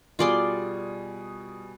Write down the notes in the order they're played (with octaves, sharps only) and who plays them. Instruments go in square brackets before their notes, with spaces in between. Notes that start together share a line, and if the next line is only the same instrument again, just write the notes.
[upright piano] B2 G3 G#4 [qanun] F4 D5 C6